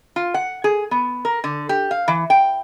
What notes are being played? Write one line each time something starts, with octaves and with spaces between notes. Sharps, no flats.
F4
F#5
G#4
B3
A#4
D3
G4
F5
E3
G5